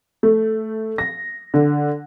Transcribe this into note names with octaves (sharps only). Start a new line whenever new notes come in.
A3
A#6
D3